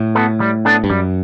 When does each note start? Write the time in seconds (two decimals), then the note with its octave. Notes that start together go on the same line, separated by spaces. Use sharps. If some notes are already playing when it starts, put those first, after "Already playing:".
Already playing: A2
0.15 B3 F#4 A4
0.40 G3
0.65 B3 D4 A4
0.84 G2
0.90 F#2 G3